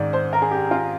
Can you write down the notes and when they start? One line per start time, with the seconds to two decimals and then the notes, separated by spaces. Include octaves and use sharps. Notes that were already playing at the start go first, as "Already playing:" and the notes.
Already playing: G#2 D#3 D5
0.13 C5
0.33 A#4
0.42 G#4
0.51 G4
0.71 F4